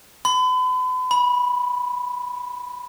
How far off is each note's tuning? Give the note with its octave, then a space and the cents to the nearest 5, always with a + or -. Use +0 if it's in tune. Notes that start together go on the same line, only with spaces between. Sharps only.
B5 +40
B5 -10